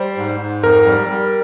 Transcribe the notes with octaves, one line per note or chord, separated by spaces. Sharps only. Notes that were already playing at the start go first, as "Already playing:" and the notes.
Already playing: G3 C5
G#2
G#2
F2 A#4
G3
G3